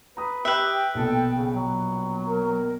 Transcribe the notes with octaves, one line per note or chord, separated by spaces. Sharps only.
B4 A#5 D#6
G4 B4 E5 G5 F#6
A#1 B2 A4
C#3
F#3
A#4